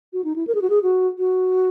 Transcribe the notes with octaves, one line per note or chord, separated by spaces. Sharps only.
F#4
D#4
E4
A#4
G#4
F#4
G#4
F#4
F#4